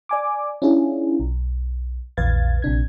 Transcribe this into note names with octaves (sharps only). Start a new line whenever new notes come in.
D5 G#5 D6
C#4 D4 E4 F4 G#4
B1
A#1 E2 B4 F5 G#6 A6
A#1 C3 D4 G#6